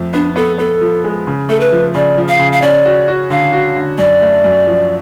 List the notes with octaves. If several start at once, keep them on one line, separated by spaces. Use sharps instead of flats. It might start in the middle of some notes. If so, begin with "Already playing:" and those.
Already playing: F2 A3
B3 D4
B3 A4
B3 A4
F3
G#3
C#3
A3 A4
B4
F3
C#3 D5
F3
F5
C#3
F5
C#4 D5
F#4
F#4
D3 F5
F#4
D3
F#2 D5
A3
F#2
F3